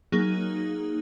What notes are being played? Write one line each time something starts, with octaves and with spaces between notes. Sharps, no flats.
F#3 A#3 D#4 G#4